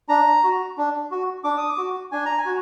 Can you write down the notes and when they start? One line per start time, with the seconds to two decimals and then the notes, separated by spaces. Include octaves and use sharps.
0.09 D4 A#5
0.44 F#4
0.78 D4
1.11 F#4
1.44 D4 D6
1.58 D#6
1.70 D6
1.78 F#4
2.12 D4 G#5
2.26 A#5
2.38 G#5
2.46 F#4